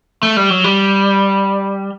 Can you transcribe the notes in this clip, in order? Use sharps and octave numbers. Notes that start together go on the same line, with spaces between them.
A3
G3
F#3
G3